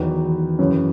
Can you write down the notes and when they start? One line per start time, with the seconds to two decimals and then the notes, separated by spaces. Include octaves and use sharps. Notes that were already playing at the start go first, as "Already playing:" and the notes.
Already playing: E2 D#3 F#3 B4
0.59 F#2 C#3 E3